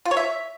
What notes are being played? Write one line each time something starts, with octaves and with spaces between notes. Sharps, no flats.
F4
C#5
E5